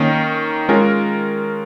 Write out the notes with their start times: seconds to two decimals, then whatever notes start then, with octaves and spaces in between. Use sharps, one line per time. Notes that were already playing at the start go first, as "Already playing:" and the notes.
Already playing: D#3 A#3 C#4
0.69 G#3 C#4 F4 A#4